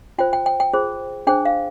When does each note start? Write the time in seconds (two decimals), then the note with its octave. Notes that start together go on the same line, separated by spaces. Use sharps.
0.18 F4 C5 G5
0.33 G5
0.46 G5
0.60 G5
0.73 F4 G#4 C5
1.27 D4 G#4 C5 G5
1.45 F5